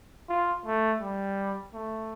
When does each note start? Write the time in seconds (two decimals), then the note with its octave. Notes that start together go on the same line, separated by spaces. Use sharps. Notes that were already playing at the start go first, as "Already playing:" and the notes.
0.29 F4
0.66 A3
1.02 G3
1.74 A3